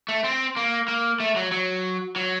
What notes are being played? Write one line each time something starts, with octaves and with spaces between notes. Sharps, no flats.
A3
C4
A#3
A#3
A3
F#3
F#3
F#3